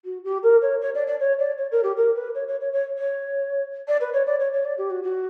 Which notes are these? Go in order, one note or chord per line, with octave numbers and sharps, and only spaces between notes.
F#4
G4
A#4
C#5
C#5
D5
D5
C#5
D5
C#5
A#4
G4
A#4
B4
C#5
C#5
C#5
C#5
C#5
D5
B4
C#5
D5
C#5
C#5
D5
G4
F#4
F#4